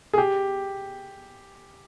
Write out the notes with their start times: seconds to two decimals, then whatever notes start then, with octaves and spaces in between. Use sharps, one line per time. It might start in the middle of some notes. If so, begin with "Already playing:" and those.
0.13 G#4
0.18 G4